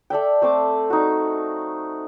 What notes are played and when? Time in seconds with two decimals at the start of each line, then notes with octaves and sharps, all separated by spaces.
0.10 A4 D5 E5 G5
0.42 A3 C4 C5 D6
0.90 D#4 F#4